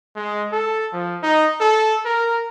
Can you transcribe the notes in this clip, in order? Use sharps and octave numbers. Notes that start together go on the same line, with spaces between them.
G#3
A4
F3
D#4
A4
A#4